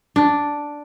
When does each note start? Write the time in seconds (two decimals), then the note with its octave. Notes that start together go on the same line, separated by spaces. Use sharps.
0.16 D4